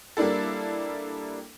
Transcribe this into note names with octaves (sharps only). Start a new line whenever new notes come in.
G3 A#3 D4 E4 A4